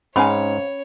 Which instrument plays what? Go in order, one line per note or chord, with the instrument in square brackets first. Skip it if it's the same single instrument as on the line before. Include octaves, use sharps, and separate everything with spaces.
[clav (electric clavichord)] G#2 [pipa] C4 F5 G#5 [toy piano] C#4 B5 [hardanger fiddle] C#5